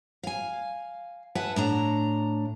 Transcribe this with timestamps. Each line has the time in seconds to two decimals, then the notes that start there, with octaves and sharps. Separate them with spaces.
0.23 F5 G#5
1.35 B4 E5 F#5 G#5 A5
1.56 A2 D4 A#5